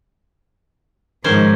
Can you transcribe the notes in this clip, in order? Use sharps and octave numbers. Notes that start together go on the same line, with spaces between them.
G#2 D#3 F3 C#4 C5